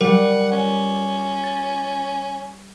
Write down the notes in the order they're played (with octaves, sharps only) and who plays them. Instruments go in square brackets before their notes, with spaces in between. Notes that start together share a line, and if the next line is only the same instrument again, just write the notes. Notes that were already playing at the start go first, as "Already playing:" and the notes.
[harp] G3 [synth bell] A#4 [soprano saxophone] F#5
[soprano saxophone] C#4
[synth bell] A6